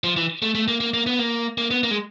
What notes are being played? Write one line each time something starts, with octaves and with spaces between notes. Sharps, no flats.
F3
E3
A3
A3
A#3
A#3
A#3
B3
A#3
A#3
B3
A#3
G#3